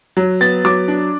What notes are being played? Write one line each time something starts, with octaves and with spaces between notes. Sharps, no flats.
F#3
B3 A6
F#3 D6
D4